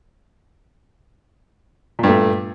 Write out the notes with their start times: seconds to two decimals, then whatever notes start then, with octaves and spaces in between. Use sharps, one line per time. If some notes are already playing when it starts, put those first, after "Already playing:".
1.99 A#2
2.03 G2
2.08 A3